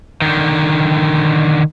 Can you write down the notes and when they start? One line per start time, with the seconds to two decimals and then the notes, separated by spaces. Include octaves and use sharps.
0.22 D3 D#3